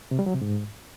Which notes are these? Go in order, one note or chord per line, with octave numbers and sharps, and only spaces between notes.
C3
G3
F#3
C3
G#2